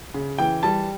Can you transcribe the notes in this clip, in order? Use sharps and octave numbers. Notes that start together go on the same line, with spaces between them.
C#3
E3 G5
G3 A5